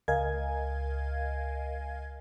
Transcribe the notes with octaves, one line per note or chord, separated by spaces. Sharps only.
C#2 A#4 D#5 F5 G#5 G#6